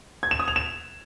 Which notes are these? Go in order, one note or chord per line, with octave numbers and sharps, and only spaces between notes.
G#6
E7
D#6
F7
E7